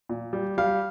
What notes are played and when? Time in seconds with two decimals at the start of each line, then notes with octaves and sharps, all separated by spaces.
0.09 A#2
0.33 G3
0.58 G3 F5